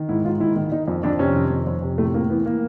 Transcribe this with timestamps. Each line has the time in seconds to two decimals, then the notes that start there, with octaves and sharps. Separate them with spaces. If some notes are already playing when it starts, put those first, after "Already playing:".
Already playing: D#3
0.09 G#2 E4
0.25 G#2 F4
0.40 D#3 E4
0.56 D#3
0.72 D#3 D#4
0.88 F2
1.03 F2 D4
1.19 C3 C#4
1.35 D#3
1.51 F2
1.67 F2
1.83 C3
1.98 A2 A3
2.14 A2 A#3
2.30 E3 B3
2.46 E3 A#3